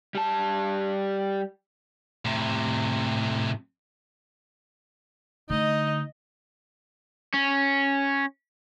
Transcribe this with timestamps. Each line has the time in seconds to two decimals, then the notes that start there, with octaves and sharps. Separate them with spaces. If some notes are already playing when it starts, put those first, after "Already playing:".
0.15 G3 A5
2.25 A2 C3
5.50 D3 A3 D#4 D#5
7.34 C#4